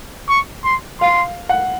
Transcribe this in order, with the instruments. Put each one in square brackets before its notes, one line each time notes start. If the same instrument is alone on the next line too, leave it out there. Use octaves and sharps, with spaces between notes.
[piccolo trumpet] C#6
C6
[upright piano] F5 [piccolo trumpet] C6
[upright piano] F#5